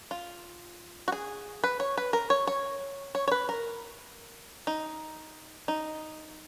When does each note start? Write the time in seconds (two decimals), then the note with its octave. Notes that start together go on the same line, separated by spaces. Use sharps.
0.11 F4
1.08 F#4
1.12 G#4
1.64 B4
1.80 C#5
1.98 B4
2.13 A#4
2.30 C#5
2.47 C#5
3.15 C#5
3.28 C#5
3.32 B4
3.49 A#4
4.67 D#4
5.68 D#4